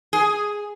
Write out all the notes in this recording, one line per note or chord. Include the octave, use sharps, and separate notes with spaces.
G#4